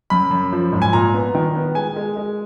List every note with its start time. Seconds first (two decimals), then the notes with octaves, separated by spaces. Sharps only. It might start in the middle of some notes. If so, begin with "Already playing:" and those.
0.10 F#2 B5
0.31 F#2
0.53 F3
0.72 G#2
0.82 G#5
0.93 A#2 A#5
1.14 B3
1.35 D#3
1.56 B3
1.75 G#3 G#5
1.96 G#3
2.17 G#3